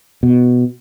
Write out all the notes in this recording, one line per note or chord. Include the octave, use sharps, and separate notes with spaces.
B2